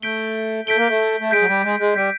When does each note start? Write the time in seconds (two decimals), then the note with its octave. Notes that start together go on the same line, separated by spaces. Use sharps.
0.02 A3 G6 B6 D7 G7
0.66 A3 G6 B6 D7 G7
0.77 A#3
0.88 A3
1.20 A3
1.31 G#3 G6 B6 D7
1.41 F#3
1.48 G3
1.64 G#3
1.80 G#3
1.95 G3 G6 B6 D7